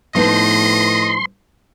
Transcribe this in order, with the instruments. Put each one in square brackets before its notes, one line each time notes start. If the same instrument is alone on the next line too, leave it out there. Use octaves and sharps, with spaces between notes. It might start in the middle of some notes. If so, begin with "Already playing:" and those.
[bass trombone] A2 [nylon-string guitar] F3 B3 D#4 [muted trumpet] D#5 [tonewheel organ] C6